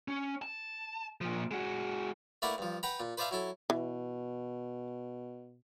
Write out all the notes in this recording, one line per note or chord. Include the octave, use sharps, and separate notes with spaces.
C#4
A5
A#2 F3
G#3 F#4
A3 A#3 D4 E4 B4 F#5
G2 F3
B4 F#5 G5 A#5 B5
A#2
B4 C5 D5 E5 F5 A5
F#3 E4 A4
B2 E3